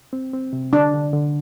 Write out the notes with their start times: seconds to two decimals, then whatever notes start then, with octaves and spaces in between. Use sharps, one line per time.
0.13 C4
0.33 C4
0.53 C3
0.73 D3 D4
0.94 D3
1.13 D3